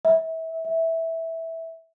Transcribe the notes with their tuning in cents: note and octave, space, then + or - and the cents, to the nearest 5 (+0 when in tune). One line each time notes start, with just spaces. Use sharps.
E5 -30
E5 -10